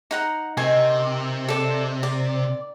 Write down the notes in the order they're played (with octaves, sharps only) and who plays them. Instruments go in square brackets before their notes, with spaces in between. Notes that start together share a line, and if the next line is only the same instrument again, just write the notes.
[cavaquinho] D#4 F#5 A#5
[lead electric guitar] C3 [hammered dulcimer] D#3 [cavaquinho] G#5
[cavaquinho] A4 D5
D5